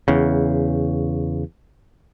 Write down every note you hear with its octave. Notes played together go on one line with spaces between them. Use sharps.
E2 C#3